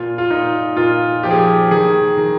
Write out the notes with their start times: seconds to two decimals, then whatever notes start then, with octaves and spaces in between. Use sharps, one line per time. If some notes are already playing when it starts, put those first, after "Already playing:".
Already playing: A#2 F4
0.18 F4
0.30 A#2 D#4
0.77 A#2 F4
1.23 F3 G4
1.31 G#4
1.38 G4
1.71 D#3 G#4
2.17 D#3